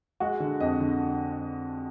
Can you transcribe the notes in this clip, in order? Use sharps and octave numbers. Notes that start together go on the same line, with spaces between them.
G#3 F#4
D3
F2 D#5
D3